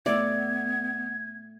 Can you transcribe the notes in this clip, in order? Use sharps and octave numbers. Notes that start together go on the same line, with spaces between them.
A3 B3 D5 E5 G#6